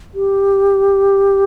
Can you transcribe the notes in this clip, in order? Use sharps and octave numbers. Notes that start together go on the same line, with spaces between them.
G4